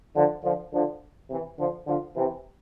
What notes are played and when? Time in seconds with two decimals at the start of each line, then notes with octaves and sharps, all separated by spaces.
0.15 D3 F3
0.43 D3 F3
0.72 D3 F3
1.30 C3 E3
1.58 D3 F3
1.87 D3 F3
2.15 C3 E3